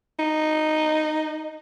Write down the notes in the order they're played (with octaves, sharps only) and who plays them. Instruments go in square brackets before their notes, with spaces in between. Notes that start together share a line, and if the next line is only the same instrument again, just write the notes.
[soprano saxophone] D#4